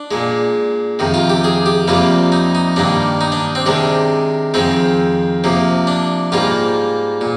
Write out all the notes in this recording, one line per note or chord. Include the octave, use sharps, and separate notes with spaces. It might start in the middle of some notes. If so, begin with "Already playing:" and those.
Already playing: D4
A#2 G#3
F2 C3 D#3
F4
G4
G#4
G4
F2 C3 G3 A#3 F4
D#4
D#4
G2 D#3 A#3 D4
D#4
D4
C4
C3 D#3 G#3 D4
F2 D#3 G#3 C4
C3 F3 A#3
D4
G#2 G3 A#3 F4
A#2